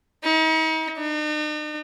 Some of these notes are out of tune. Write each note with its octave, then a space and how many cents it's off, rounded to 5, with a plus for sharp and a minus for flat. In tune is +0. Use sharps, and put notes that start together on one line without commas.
D#4 +40
D#4 -45